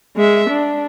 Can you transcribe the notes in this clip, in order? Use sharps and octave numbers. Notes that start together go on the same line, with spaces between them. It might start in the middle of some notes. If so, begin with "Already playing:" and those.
G#3 E5
D4